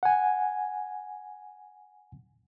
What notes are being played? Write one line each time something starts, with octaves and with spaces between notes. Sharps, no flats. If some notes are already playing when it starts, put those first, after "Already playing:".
F#5 G#5